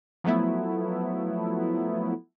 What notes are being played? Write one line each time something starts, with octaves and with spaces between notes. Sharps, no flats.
F3 F#3 A3 B3 E4